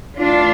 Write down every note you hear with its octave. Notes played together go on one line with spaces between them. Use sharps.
A2 E3 D4 F4